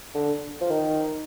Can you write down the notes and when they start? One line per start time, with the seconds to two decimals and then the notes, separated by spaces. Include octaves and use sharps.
0.15 D3
0.61 F3
0.70 D#3